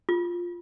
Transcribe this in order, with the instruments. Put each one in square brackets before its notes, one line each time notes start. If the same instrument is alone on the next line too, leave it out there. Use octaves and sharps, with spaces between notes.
[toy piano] F4